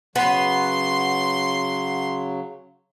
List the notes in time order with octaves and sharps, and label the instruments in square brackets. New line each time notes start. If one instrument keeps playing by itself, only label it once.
[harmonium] C#3 F#3 [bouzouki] B3 B4 [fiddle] C6